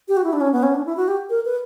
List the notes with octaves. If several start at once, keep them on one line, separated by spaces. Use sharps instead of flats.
G4
F#4
E4
D4
C#4
B3
C#4
D4
E4
F#4
G4
A#4
B4